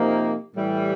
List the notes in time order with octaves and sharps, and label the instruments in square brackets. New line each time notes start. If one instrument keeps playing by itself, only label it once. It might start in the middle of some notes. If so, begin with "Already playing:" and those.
Already playing: [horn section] C3 F3 A#3 D#4
A2 E3 G3